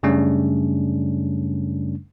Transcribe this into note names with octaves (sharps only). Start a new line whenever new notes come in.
F#2 C#3 G3 A3 C#4 D4